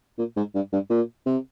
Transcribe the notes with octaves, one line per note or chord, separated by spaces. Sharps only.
A#2
G#2
G2
G2
A#2
C3